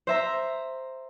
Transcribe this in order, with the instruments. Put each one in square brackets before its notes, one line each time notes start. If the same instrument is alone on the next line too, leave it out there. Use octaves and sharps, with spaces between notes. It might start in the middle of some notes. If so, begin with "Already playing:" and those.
[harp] C5 E5 A#5